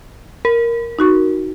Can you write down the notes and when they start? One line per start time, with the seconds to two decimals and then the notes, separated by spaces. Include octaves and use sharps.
0.45 A#4
0.99 D#4 F#4 C#6